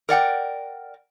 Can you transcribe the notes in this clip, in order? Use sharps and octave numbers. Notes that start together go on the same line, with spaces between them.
A#4 D5 F#5 G5